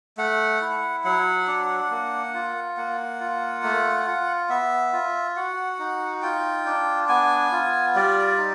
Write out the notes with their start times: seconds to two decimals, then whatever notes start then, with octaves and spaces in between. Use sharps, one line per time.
0.18 A3 F#5
0.61 E4
1.05 F#3 F#5
1.47 D4
1.91 A#3
2.34 F4
2.77 A#3 F#5
3.20 F4
3.63 A3
4.06 F4
4.49 B3 E5
4.93 F4
5.36 F#4 F#5
5.79 D#4
6.22 F4 G5
6.66 D4
7.09 B3 G#5
7.52 F4
7.95 G3 D5
8.38 D#4